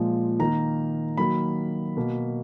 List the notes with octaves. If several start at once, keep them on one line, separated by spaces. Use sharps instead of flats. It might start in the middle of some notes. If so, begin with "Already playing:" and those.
Already playing: A#2 F3 G#3
D#3 A#3 A#5
D#3 F#3 A#3 B5
B2 A#3